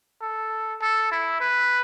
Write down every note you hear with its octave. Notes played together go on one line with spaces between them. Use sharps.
A4
A4
E4
B4